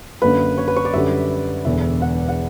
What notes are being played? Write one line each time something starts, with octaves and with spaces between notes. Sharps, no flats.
F#2 D3 A#3 B4
C#5
B4
C#5
D5
F#2 D3 G3 E5
E1 E2 D3 E5
F#5
F#5